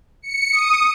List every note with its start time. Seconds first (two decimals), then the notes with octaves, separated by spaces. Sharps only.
0.22 C#7
0.52 D#6